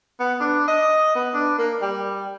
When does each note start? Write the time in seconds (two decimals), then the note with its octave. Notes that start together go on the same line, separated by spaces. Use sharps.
0.20 B3
0.41 D4
0.68 D#5
1.15 B3
1.34 D4
1.58 A#3
1.82 G3